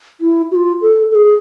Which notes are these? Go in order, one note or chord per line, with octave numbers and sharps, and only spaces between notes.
E4
F#4
F4
A4
A4
G#4